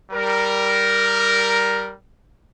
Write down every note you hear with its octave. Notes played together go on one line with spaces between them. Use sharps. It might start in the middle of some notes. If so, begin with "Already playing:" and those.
G3 A#4